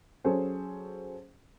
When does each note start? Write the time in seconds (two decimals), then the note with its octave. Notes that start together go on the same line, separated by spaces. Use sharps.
0.24 F#3 C#4 G#4 A4 C5